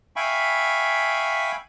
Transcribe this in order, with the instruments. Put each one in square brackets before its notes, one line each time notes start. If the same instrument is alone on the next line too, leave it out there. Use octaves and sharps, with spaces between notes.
[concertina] E5 F5 G5 G#5 B5 C#6